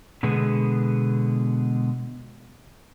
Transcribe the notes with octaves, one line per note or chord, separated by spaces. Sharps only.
B2 D3 G#3 B3